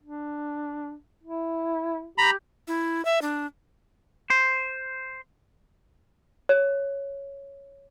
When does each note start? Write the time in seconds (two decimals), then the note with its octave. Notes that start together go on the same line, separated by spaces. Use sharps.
0.03 D4
1.24 E4
2.18 G4 A#5 B5
2.68 E4
3.05 E5
3.22 D4
4.30 C5
6.49 C#5